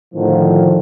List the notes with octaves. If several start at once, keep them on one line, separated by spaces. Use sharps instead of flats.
A2 D3 D#3 F3